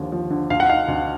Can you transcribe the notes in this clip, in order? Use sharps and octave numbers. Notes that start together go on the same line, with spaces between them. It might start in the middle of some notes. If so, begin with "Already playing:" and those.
Already playing: D#2 D3 F3
F3
D3
D2 F5
F#5
D#4 F5
D2